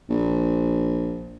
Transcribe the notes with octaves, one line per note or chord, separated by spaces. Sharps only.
A#1